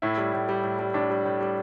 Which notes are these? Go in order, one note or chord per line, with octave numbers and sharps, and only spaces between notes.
A2 E4
G3
A2
G3
A2
G3
A2 D4
G3
A2
G3